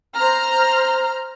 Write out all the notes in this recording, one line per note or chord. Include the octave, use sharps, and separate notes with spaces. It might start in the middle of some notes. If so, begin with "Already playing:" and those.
C5 A#5 F6